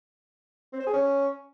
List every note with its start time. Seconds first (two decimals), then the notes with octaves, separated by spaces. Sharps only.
0.73 C4
0.80 C5
0.87 G#4
0.93 C#4